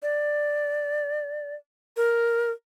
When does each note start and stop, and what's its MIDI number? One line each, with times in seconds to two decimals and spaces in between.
0.02 1.55 74
1.97 2.50 70